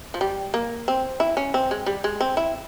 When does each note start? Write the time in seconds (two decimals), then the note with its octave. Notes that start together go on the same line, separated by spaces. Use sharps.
0.14 F3
0.21 G3
0.54 A#3
0.88 C4
1.20 E4
1.37 C#4
1.54 C4
1.71 G#3
1.86 G3
2.04 G#3
2.21 C4
2.37 E4